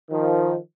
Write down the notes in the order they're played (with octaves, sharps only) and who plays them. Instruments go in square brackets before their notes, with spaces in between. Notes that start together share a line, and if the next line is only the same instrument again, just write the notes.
[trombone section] D#3 F3